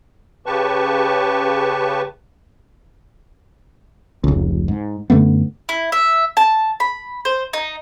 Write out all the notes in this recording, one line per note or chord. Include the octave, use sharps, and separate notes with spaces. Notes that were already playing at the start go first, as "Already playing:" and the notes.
C#3 G4 B4 A5 C#6
F1 C#2
G#2
F#2 D3 A3 B3
E4
E5
A5
B5
C5
D#4